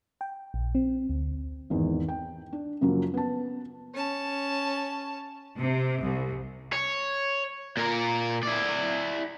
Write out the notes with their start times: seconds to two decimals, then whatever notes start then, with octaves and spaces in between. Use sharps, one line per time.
0.21 G5
0.54 A#1
0.75 C4
1.09 D2
1.70 G#1 E2 G#2
2.08 G5
2.53 D4
2.81 F#2 C#3 F3 F#3 A#3
3.14 B3 A5
3.94 C#4 A5
5.57 C3
6.01 C2
6.73 C#5
7.77 A#2 A#4
8.43 E4 D5